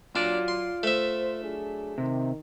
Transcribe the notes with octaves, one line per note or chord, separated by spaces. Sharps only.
F#3 D4 F4 D5
C6
A3 C5 E5
F#3 D4 G#4
C3 D#3